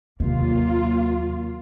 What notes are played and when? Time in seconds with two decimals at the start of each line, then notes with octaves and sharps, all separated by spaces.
0.20 D#2 C3 F#3 A#3 C#4 F4